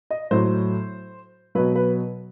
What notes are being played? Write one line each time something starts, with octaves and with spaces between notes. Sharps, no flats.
D#5
A2 F#3 C5
B2 F#3 B4
B4